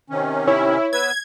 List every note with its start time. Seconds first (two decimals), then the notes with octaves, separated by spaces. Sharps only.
0.10 C3 D#3 C#4
0.48 E4 C#5
0.93 B3 B4 E6 G#6